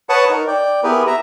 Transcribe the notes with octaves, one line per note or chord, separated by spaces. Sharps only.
B4 C#5 F#5 A5 C#6 D#6
D#4 A#4
D5 G5
B3 E4 G4 G#4 A#4 B4
E5 A#5